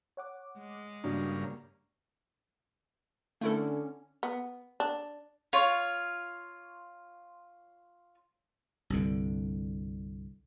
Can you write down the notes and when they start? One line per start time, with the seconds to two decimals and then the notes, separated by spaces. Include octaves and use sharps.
0.17 C#5 F#5 D6
0.58 G#3
1.04 G2 C#3 A#3 D4 F#4 D5
3.41 D3 A3 C#4 E4 A4
4.23 B3
4.80 D4
5.53 F4 C#5
8.90 C2 G2 D3